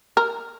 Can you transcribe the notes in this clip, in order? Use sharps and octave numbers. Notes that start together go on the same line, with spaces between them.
A#4